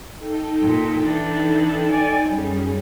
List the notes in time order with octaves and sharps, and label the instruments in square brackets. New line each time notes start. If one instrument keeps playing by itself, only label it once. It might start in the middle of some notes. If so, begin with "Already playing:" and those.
[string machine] D#4 A4 G5
[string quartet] A#2
E3 D4
D5 G#5
[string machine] F#2 C#4 G#4 [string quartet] G3